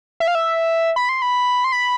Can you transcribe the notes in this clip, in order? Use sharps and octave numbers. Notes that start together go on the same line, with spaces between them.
E5
F5
E5
B5
C6
B5
C6
B5